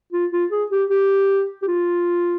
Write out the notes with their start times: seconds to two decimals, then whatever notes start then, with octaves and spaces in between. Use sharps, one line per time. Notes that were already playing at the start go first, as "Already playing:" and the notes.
0.13 F4
0.32 F4
0.51 G#4
0.71 G4
0.90 G4
1.62 G4
1.68 F4